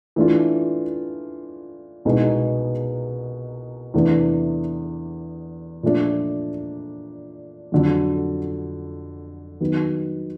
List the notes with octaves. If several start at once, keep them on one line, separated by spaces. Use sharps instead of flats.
E3 A3 D4 F4
C2 B2 G#3 B3 D#4
E2 C3 E3 A3 D4
A#2 F3 A3 D4
F2 D3 F#3
D#3 F#3 B3